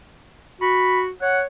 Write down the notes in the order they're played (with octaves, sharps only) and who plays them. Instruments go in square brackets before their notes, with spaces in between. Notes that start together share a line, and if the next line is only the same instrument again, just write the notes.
[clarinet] F#4 [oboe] B5
[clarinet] C#5 [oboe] F#5